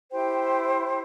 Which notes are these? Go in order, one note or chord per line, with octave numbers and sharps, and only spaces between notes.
E4 G4 C5 G5